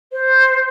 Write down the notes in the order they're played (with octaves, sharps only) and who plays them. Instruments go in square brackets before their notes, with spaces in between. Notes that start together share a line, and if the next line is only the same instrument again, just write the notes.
[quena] C5